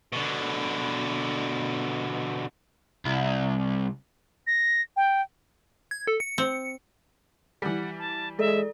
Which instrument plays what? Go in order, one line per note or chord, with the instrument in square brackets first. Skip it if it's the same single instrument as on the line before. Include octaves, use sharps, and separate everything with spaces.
[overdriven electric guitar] B2 D3
C2
[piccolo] A#6
G5
[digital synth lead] G#6
A4
C#7
[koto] C4
[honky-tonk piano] E3 G3 [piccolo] F#5
[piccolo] A5
[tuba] G#3 [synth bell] A4 D5 [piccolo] E5